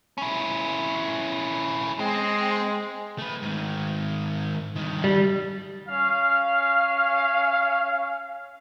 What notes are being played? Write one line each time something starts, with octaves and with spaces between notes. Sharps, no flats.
C#4 E4
G#3 C4
A3 B4
G#2 D#3
G2 D#3
G3
C#4 F5